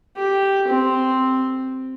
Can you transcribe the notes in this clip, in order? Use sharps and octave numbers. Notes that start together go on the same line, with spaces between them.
G4
C4